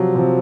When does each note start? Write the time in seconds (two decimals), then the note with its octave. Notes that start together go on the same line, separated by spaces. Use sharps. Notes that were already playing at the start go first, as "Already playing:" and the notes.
Already playing: C3 F3 F#3
0.15 C3 F3